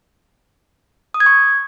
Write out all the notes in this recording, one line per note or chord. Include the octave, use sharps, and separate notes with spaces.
D#6
G#6
C#6